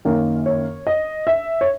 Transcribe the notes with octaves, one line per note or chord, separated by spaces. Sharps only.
F#2 D#3 A#3 C#4
C#5
D#5
E5
C#5